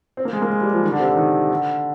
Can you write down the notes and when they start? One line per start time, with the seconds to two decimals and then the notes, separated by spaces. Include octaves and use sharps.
0.17 C4
0.25 A#3
0.33 G#3
0.42 A#3
0.50 G#3
0.61 G3
0.73 F3
0.83 D#3
0.92 D3
1.00 C3
1.08 D3
1.17 D#3
1.51 D3